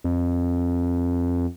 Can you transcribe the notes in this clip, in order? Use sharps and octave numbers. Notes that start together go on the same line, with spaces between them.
F2